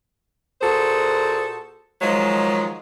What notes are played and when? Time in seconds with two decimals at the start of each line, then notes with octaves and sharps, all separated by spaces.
0.62 A#2 F#4 G#4 A4 C5
2.02 D#3 F3 F#3 G#3